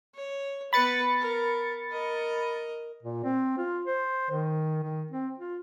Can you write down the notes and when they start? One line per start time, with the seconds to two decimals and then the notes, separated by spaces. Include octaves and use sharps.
0.15 C#5
0.73 B3 B4 B5 A6 C#7
1.20 A#4
1.90 A#4 D#5
3.03 A#2
3.24 C4
3.58 F4
3.85 C5
4.31 D#3
4.83 D#3
5.11 C4
5.38 F4